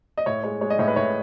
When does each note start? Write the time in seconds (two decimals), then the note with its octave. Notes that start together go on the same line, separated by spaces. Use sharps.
0.18 D#5
0.26 A2 C#5
0.44 G#3 C#5
0.61 G#3 C#5
0.70 D#5
0.79 A2 C#5
0.88 B4
0.96 A2 C#5